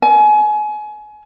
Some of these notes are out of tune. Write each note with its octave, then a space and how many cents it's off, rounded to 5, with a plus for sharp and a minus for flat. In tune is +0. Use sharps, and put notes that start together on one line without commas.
G#5 +30